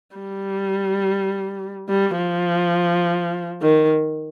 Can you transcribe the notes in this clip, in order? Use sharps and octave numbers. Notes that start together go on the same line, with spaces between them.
G3
G3
F3
D#3